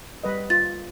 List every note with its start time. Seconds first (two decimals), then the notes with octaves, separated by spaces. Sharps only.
0.23 G3 B4 D#5
0.50 F4 A6